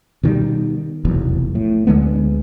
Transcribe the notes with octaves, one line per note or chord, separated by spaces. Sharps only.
B2 D#3 F3 G3
F1 B1 E2
A2
D2 D3 G#3 B3